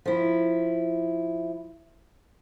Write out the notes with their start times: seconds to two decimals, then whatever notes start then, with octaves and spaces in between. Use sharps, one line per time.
0.05 F3 E4